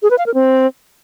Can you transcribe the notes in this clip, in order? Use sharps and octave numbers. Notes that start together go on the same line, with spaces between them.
G#4
B4
F5
A#4
C4